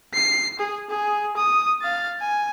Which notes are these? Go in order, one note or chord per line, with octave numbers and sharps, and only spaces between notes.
C7
G#4
G#4
D#6
F5 A6
G#5